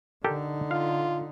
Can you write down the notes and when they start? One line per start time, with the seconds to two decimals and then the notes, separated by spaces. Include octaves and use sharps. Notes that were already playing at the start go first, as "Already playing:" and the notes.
0.24 D3 D#4 G4 A4 A#4
0.71 F4 F5